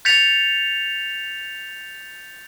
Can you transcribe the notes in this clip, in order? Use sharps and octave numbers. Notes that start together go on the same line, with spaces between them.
G6 A6 B6 C#7 F7